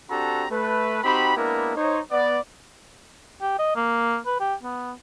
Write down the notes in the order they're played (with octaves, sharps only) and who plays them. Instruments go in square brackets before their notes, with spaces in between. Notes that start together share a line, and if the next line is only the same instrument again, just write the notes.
[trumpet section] C4 D4 F#4 G4 A4 A#5
A3 B4
C4 D#4 F#4 G4 B5
G#3 A#3 B3 D4 E4 A#4
D#4 C5 C#5
B3 D5
[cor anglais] G4
D#5
A#3
B4
G4
B3